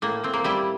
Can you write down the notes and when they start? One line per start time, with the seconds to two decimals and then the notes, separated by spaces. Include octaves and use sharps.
0.02 A2 A#3
0.24 A2 C4
0.34 A#3
0.44 G3 E4